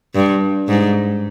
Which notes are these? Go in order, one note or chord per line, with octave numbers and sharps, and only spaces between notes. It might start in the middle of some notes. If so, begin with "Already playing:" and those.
G2
G#2